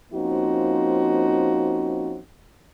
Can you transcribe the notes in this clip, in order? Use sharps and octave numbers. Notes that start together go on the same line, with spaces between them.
F3 A#3 C4 C#4 D#4 F#4